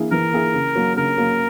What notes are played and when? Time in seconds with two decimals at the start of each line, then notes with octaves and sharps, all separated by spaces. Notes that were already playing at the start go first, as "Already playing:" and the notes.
Already playing: E3 A#3 E4 G#4
0.11 E3 A#4
0.33 A#3 E4 G#4
0.54 C#3
0.75 F#3 A#3
0.96 C#3 A#4
1.18 F#3 A#3